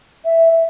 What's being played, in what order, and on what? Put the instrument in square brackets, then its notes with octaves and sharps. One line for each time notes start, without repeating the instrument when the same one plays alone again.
[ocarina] E5